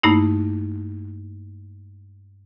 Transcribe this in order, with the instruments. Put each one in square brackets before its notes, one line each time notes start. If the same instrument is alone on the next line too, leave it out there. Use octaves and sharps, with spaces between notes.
[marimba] G2 A3 A#3 D#4 E4